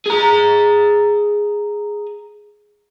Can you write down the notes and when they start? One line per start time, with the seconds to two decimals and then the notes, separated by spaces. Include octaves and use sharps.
0.06 G#4 A#5